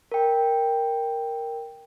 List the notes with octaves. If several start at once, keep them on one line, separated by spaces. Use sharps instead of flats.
A#4 G5